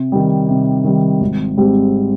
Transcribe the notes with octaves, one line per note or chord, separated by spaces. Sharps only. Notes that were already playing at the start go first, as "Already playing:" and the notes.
Already playing: C3
D#3 G3
C3
D#3 G3
G#1
G#2 G3 C4 G4